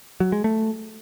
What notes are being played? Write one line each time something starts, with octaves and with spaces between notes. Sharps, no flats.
F#3
G#3
A3